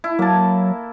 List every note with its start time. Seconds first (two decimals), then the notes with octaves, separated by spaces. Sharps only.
0.04 E4
0.19 F#3 A#3 A5